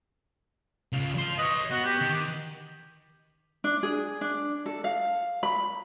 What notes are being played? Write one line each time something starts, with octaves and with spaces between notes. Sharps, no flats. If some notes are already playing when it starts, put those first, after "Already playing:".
C#3 F4
C5 F5
B4 C#5 D#5
B3 F#4
G4
D#3
D4
G#4
D4
A4
F5
B5